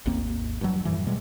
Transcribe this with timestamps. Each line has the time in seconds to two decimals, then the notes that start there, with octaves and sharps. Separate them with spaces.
0.06 G#1 D#2 A#3 C4
0.61 G2 F#3
0.85 F#2 A2 E3
1.06 B2 G3 G#3